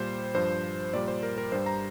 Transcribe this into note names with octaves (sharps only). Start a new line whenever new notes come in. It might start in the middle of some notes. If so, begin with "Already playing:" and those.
Already playing: A#2 G3 C5
G2 F3 C5
A#2 G3 D5
C5
A#4
A#4
G2 G3 C5
A#5